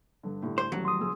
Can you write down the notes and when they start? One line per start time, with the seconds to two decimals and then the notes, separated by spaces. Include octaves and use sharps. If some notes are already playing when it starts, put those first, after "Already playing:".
0.23 G2 D3
0.42 A2 D3 G3
0.58 C5
0.72 D#1 A1 F#3 G3
0.85 C6 D#6
1.00 C#2 G#4 E6